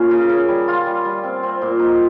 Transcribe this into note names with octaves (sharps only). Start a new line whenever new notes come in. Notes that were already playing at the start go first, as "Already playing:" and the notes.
Already playing: A#2 A#3 C#4
C#3
C#3
G3
F4
G3
G3
C4
C4
A#2
D#4